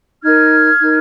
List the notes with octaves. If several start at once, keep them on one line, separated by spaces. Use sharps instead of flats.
D#4 A#4 F6 G#6
D#4 A#4